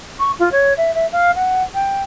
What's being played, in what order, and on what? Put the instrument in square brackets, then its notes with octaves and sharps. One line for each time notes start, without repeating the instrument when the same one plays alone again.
[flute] C#6
F4
C#5
E5
E5
F5
F#5
G5